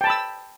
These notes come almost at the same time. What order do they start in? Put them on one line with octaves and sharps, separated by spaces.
G5 A5 B5 E6